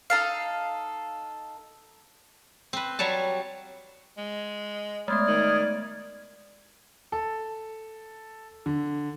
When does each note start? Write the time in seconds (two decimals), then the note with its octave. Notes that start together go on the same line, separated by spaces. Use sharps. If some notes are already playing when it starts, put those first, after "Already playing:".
0.10 D#4 A4 F5
2.73 C4 B4
2.99 F#3 G3 C#5 A5
4.18 G#3
5.08 G#3 A3 B3 D5 D#6 F6 G#6
5.28 D#3
7.12 A4
8.66 D3